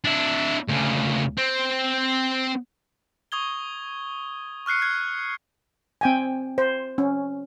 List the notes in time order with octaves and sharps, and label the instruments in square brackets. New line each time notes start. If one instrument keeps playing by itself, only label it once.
[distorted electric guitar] D4 E4
D2 C#3
C4
[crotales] C#6 D#6 G#6 G7
C#6 F6 F#6 C7 C#7
F#6 G#6
[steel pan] C4 G5 G#5
C5
C#4